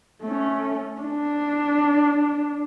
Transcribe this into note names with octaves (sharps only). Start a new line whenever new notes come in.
A3 C#4
D4